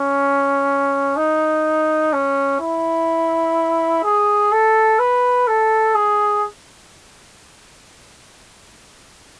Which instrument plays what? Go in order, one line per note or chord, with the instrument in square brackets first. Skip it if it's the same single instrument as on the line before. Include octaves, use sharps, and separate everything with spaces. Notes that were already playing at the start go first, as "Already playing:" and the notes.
Already playing: [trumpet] C#4
D#4
C#4
E4
G#4
A4
B4
A4
G#4